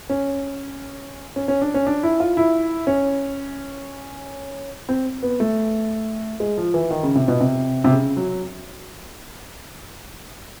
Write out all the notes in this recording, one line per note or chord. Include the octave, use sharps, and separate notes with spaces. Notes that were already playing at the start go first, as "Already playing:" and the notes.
C#4
C#4
C#4
D4
C#4
D4
E4
F4
E4
C#4
C4
B3
A3
G#3
F3
E3
D#3
C#3
C3
B2
C3
C3
C#3
F#3